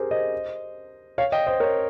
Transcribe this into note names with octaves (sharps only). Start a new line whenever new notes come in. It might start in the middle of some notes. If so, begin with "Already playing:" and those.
Already playing: G4 G#4 A#4 C5
C5 D#5
C#5 F5
D#5 G5
C5 D#5
A#4 C#5